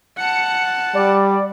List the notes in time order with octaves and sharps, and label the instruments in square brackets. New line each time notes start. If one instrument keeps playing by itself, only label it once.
[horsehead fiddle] F#5 A5 [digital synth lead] C#7
[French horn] G3 [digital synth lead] D5